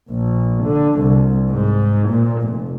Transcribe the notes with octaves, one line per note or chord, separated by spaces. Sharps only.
A#1
D3
C2
G#2
A#2
F1